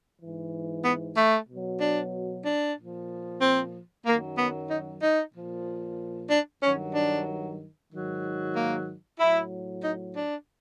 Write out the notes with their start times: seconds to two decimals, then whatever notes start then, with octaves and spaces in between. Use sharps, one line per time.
0.20 E3
0.25 G#2
0.85 B3
1.17 A3
1.49 B2 F#3
1.81 D4
2.46 D4
2.78 A#2 F3
3.42 C4
4.06 F#2 D#3 F#3 A#3
4.38 B3
4.70 D#4
5.02 D#4
5.35 A#2 F3
6.31 D4
6.63 G2 D#3 F#3 C#4
6.95 D4
7.92 G#2 D#3 F#3
8.56 A#3
9.20 A2 F#3 E4
9.84 D#4
10.16 D4